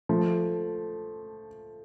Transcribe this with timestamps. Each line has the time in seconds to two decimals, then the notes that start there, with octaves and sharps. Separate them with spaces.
0.09 F3 A3